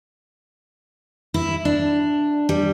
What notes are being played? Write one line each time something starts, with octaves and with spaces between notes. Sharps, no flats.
E4
D4
G3